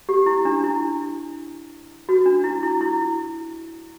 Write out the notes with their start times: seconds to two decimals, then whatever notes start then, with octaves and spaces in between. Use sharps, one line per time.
0.09 G4
0.26 E4
0.45 D4
0.64 E4
2.09 F#4
2.26 D4
2.44 E4
2.63 E4
2.81 E4